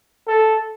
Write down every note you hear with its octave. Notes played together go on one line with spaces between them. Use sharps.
A4